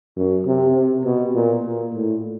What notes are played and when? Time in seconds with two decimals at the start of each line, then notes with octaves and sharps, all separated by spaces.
0.17 F#2
0.46 C3
0.75 C3
1.04 B2
1.34 A#2
1.64 A#2
1.94 A2